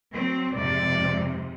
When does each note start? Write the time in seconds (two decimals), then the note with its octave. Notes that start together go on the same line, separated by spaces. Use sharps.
0.13 F#3 C4
0.53 F2 G#2 C3 D5